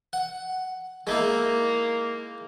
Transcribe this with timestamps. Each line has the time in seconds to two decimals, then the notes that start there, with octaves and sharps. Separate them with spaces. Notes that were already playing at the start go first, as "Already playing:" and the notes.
0.13 F#5
1.07 G#3 A#3 D#4 E4